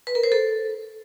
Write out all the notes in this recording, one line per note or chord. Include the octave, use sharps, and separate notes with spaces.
B4
A#4
C5
A4